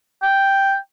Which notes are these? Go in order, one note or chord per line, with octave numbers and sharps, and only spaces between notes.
G5